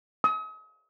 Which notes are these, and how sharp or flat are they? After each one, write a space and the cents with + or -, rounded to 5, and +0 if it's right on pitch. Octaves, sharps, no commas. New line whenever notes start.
D#6 +40